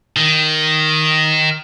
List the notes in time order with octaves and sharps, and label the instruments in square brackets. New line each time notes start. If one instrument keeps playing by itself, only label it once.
[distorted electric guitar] D#3